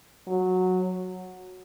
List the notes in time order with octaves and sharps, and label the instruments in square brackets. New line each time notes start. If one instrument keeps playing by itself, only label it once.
[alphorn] F#3